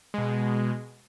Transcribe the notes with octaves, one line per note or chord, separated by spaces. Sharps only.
B2 G#3